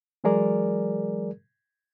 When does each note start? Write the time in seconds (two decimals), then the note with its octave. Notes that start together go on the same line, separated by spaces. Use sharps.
0.24 E3 F#3 G#3 G#4 A#4 D5